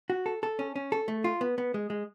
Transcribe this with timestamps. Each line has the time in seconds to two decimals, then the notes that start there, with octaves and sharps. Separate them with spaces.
0.10 F#4
0.26 A4
0.43 A4
0.59 C#4
0.76 C#4
0.92 A4
1.08 A3
1.24 F4
1.41 B3
1.58 B3
1.74 G#3
1.90 G#3